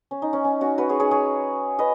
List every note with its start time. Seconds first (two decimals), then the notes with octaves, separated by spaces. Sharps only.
0.11 C#4
0.22 D#4
0.33 C#4
0.44 C#4
0.61 C#4 F#4
0.78 F#4 B4
0.89 G#4 C#5
1.00 G#4 C#5
1.11 G#4 C#5
1.79 B4 D#5